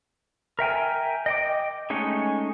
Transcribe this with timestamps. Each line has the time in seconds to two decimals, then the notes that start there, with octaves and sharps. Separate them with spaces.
0.59 A#4 E5 G5 G#5
1.26 D#5 G5 D6
1.90 G#3 A3 C#4 D#4 G#4